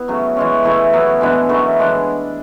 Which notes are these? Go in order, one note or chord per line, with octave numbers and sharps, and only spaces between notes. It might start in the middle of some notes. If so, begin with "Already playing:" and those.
Already playing: B3 E4
C#3 F#3 A3
E3 G#3 C#4
C#3 E3 A3 E4
F#3 B3 E4
E3 G#3 B3 D4
F#2 C#3 E3 A3
G#3 D4